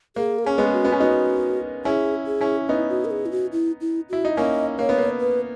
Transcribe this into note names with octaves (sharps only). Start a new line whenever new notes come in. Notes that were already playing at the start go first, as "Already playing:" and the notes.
A#3 G#4
A#4
C#4 G#4
G#3 B3
F#4
B3
C#4
B3 D#4 F#4
C#4 E4 G#4
G#4
C#4 E4
B3 D#4 E4
F#4
A#4
G#4
E4
F#4
E4
E4
E4 F#4
D#4
A#3 C#4 D#5
A#3 C#5
B3
A#3
B4